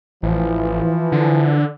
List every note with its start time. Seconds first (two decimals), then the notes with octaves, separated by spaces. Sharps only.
0.23 A1 E3 F3
1.12 D3